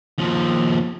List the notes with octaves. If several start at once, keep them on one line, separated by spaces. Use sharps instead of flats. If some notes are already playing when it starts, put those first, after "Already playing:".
D#2 F3